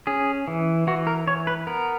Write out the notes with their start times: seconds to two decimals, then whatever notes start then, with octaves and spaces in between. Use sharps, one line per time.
0.07 C#4 G#4
0.48 E3
0.87 E3 F#4
1.07 A#4
1.27 E3 C#5
1.47 B4
1.67 B3 A#4